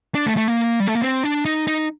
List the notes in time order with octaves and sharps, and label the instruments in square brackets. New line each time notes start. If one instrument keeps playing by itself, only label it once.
[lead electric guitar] D4
A3
A3
A#3
G3
A3
A#3
C4
D4
D#4
D#4